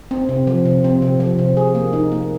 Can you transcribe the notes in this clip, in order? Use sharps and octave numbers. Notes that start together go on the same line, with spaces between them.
C4
C3
F3
C3
C4
C3
F3
C3
G#4
A#3
D#4
A#3